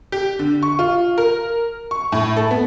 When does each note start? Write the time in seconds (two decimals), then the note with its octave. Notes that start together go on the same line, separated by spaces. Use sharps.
0.12 G4
0.39 D3
0.63 C#6
0.79 F4
1.18 A#4
1.91 C#6
2.12 A2
2.37 A4
2.51 B3